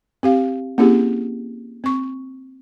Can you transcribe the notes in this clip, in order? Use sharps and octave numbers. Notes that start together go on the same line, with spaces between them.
C4 G4 F5
A#3 C4 C#4 E4 G4 G#4
C4 C#6